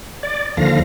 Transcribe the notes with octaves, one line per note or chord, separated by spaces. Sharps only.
D5
D#2 D3 F3 F5 A#6